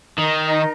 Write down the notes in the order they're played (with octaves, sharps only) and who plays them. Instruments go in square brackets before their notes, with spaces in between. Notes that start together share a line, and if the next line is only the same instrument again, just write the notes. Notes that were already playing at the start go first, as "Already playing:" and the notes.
[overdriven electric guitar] D#3 [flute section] D#4 A#4 D#5